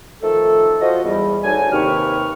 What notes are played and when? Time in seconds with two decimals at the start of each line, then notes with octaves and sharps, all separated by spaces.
0.22 D#3 F3 A3 A4
0.81 F3 F#4 D#5
1.04 E2 G3
1.44 D2 F#3 D4 D#4 G#5
1.72 D#2 C3 G4 B4 C#6 F6